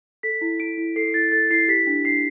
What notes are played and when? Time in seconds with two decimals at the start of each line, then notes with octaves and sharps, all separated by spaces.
0.23 A4 B6
0.41 E4
0.60 E4 D7
0.78 E4
0.96 A4 C7
1.14 E4 A6
1.32 A4 A6
1.50 E4 C7
1.68 G4 B6
1.87 D4
2.05 D4 C7